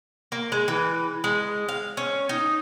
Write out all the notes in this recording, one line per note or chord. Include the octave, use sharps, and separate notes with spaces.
A#3
G#3
E3
G#3
F5
C#4
D#4